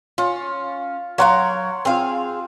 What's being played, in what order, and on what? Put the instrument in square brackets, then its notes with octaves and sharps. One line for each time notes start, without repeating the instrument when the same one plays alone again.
[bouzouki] C#4 [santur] F4
[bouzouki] F#3 A#4 F5 [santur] C#5 F#5 C6
[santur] C4 F4 [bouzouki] G#4 F5